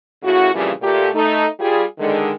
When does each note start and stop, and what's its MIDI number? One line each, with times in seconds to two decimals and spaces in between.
0.23 0.53 49
0.23 0.53 57
0.23 0.53 64
0.23 0.53 66
0.53 0.71 41
0.53 0.71 46
0.53 0.71 49
0.53 0.71 52
0.53 0.71 53
0.53 0.71 55
0.82 1.09 46
0.82 1.09 57
0.82 1.09 67
1.14 1.46 57
1.14 1.46 63
1.60 1.84 55
1.60 1.84 65
1.60 1.84 68
1.99 2.32 50
1.99 2.32 51
1.99 2.32 56